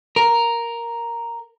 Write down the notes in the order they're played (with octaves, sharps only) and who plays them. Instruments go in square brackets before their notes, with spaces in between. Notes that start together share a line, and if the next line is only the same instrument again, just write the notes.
[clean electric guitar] A#4